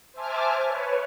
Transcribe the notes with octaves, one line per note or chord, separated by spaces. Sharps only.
C5 E5 G#5 A5 D6 F6
B4 C#5